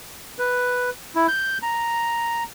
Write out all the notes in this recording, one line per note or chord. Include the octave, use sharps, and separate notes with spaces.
B4
E4
G6
A#5